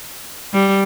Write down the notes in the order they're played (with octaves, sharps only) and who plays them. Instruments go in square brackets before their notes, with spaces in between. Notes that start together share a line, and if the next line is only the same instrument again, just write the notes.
[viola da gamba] G3